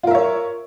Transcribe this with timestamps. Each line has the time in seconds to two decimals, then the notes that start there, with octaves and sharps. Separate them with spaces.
0.03 F4
0.07 A#4
0.11 E5
0.15 C#5